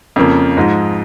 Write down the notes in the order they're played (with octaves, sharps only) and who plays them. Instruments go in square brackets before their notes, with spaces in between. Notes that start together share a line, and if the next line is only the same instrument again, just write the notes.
[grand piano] F2 C#3 F3 A#3
G#2 F3 G#3